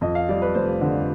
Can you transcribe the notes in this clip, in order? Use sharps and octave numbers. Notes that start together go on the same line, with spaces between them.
F2 D#5
F5
G3 D5
B4
F1 C5
D3